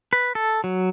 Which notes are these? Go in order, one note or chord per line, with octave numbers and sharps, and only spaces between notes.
B4
A4
F#3